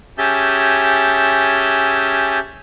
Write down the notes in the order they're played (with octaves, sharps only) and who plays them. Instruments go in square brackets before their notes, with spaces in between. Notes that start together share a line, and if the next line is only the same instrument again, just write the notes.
[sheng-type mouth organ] C#4 G4 G#4 E5 A5 G6